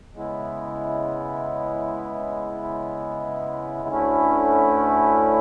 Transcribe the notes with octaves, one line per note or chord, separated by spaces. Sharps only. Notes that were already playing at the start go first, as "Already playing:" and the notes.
C#3 G#3 B3 E4
D2 D3 A3 C#4 E4